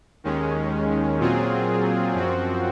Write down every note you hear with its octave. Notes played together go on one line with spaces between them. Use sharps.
D#2 D#3 G#3 C#4
A#2 F#3 C4 F4 G#4
F#2 F3 C4 F#4